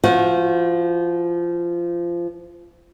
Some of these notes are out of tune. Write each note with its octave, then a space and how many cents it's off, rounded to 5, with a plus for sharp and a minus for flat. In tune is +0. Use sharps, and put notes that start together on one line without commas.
F3 -20 F#4 -35